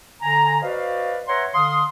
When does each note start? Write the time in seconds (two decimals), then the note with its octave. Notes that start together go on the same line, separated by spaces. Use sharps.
0.22 D3 G#5 A#5
0.62 F#4 B4 C5 D5 D#5 F5
1.28 B4 C#5 E5 F#5 A#5 C6
1.53 D3 F5 C6 D#6